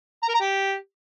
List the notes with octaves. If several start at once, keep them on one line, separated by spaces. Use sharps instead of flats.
A#5
A#4
A#5
G4